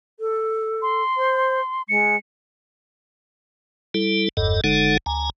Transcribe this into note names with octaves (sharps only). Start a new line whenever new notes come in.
A4
C6
C5
G#3 C#7
G3 E4 A4
F#1 E2 G2 A4 D#5
F#1 D3 G#3 D#4 A4 F#5
D2 G#5 A#5